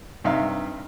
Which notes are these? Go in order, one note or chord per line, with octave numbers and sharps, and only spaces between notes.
G2 C3 D#4 E5 F5